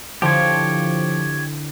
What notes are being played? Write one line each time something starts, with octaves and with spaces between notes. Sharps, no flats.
D3 F3 E4 G4 C#5